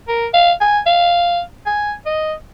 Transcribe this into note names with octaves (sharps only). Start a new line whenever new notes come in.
A#4
F5
G#5
F5
G#5
D#5